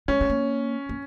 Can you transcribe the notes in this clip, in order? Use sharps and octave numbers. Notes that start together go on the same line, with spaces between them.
G#3 C#4
G#3
A#3
A#3